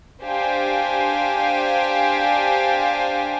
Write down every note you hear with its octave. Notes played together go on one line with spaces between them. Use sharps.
D4 G4 C5 F5 G#5